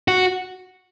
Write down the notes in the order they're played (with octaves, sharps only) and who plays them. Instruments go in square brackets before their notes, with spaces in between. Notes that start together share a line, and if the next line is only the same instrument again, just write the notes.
[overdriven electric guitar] F#4